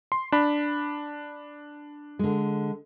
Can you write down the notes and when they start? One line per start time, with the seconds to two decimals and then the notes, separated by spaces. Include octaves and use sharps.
0.12 C6
0.32 D4 B5
2.19 D3 G#3